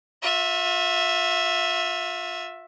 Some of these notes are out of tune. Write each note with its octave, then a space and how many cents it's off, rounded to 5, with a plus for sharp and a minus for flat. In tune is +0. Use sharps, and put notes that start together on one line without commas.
F4 +35 E5 +0